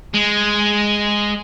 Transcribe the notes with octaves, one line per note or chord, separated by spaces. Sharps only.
G#3